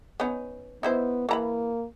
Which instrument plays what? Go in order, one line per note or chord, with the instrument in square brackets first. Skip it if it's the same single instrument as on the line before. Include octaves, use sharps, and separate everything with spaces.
[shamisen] B3 C#4 D#4
[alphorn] B3 [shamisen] D#4 E4 C5
[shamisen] E3 A#5 B5 [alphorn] A#3